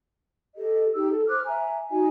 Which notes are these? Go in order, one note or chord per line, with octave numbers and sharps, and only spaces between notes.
G4 A4 D#5
D#4 G4 E6
A4
C5 D6 F6 F#6
E5 G#5 A#5
D#4 F#4 D#5 G#5